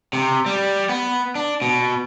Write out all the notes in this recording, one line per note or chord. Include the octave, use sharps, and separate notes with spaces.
C3
G3
B3
D4
B2